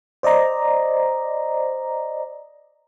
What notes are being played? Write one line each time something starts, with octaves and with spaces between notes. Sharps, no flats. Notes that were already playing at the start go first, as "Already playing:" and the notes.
C5 D5 D#5 A#5